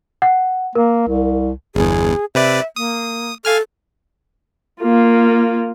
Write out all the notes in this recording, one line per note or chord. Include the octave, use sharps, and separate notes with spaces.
F#5
A#3 A#4
C2
G1 E2 G#4
C3 B4 D5 E5
A#3 D#6
A4 F5 G#5 F6
A#3 F4